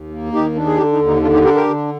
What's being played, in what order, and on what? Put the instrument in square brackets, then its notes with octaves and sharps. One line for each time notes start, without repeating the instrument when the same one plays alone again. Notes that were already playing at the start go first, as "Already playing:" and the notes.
Already playing: [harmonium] D#2
A#3
D#2 D#4 G4
D4
G#4
D3 D#4 G4
D#4
D#2
D#4
D3 D4 F4
D#4 G4
D4 G4 A#4
G4 A#4
D3